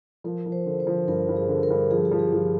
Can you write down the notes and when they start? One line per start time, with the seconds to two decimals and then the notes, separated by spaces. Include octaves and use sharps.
0.24 F3 A#4
0.46 F3
0.52 C5
0.66 D3
0.80 C5
0.87 F3
1.08 G2 A#4
1.29 G2
1.36 G#4
1.49 D3
1.63 A#4
1.70 G2
1.91 F3 G#4
2.05 G4
2.11 F3
2.19 G#4
2.33 F3